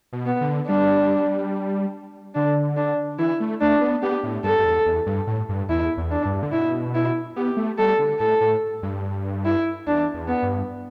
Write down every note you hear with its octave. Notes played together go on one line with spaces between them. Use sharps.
B2
B3
D3
G3 D4
D3 D4
D4
E3 E4
A3
A3 D4
B3
B3 G4
A2
G2 A4
G2
E2
E2
G2
A2
G2
E2 E4
E2
D4
G2
D3
B2 E4
E4
B3 G4
A3
G3 A4
D3
A2 A4
A2
G2
E4
E2 D4
E2
B3
G2